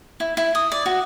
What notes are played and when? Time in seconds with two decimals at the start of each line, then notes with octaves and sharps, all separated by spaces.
0.20 E4
0.37 E4
0.55 D#6
0.72 D5
0.86 F#4